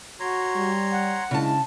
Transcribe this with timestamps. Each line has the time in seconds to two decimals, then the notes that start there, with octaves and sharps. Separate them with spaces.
0.20 F#4 C#5 A#5 C6
0.55 G3
0.92 F#5
1.31 C#3 G#3 D4 E4 A5